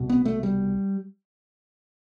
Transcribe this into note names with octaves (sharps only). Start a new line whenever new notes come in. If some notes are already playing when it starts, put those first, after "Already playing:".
Already playing: C2 B2
B3
A3
G3